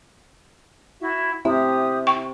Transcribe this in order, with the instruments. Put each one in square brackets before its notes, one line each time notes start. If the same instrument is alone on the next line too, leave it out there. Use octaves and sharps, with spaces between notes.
[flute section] E4 F#4 E5
[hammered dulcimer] C3 [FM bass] E4 [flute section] G4 D#6
[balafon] G5 C#6